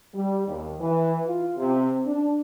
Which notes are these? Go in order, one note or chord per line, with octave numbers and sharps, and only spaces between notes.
G3
D#2
E3
F4
C3
D4